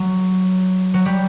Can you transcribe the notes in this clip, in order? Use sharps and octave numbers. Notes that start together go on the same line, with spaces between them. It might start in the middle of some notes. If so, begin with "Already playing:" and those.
Already playing: F#3
F#3
G3